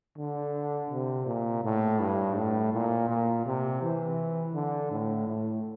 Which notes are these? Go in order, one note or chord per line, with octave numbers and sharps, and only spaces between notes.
D3
C3
A#2
A2
G2
A2
A#2
A#2
C3
E3
D3
A2
A2